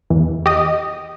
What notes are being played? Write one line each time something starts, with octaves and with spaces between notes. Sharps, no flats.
E2
G4 D#5